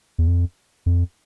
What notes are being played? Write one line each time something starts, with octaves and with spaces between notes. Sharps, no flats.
E2
F2
F2